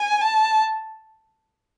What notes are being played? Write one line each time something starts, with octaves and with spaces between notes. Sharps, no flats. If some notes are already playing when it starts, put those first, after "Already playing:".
Already playing: G#5
A5